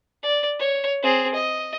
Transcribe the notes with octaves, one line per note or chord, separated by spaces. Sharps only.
D5
C#5
C4 G#4
D#5